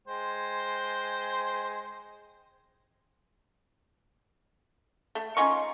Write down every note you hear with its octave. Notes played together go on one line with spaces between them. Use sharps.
G#3 C5 G5
A3
C#4 D#4 F4 C#6